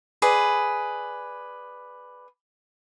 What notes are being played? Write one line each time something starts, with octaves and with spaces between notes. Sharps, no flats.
G#4 B4 D5